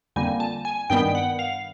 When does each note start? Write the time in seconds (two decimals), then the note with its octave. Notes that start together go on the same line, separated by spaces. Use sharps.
0.16 F2 D3 G3 A#3 G#5
0.40 A5
0.65 G#5
0.90 G2 D#3 G3 B3 G5
1.15 F#5
1.39 F5